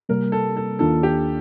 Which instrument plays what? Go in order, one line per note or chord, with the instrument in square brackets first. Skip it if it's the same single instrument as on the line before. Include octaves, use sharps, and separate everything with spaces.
[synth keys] C3 G3 A#3 [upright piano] A#4
[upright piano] A4
A4
[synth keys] D#2 D#3 A#3 D4 F4 [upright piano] A4
[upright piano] G4